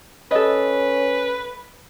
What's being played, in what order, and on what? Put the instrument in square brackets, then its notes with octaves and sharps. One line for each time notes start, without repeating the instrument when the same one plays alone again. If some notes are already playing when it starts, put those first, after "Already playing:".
[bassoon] C#4 [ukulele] A4 D#5 [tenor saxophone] B4